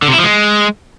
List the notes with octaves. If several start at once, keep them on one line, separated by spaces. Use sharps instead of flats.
D3
C3
E4
F3
G#3